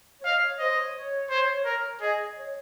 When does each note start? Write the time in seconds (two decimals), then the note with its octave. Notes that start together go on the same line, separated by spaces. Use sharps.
0.19 C#5
0.25 D#5 F5
0.41 C#5
0.59 C5 D#5
0.77 C#5
0.95 C#5
1.30 C5
1.65 A#4
2.01 G#4 D#5
2.36 C#5